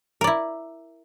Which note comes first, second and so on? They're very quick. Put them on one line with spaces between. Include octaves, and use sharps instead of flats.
A#4 D5 E4